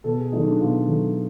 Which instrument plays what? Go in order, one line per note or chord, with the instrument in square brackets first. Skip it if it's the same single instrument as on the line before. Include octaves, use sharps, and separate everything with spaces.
[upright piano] B2 A4
G#4
F#3 A3 D#4
D4
B2 F4
F#3 A3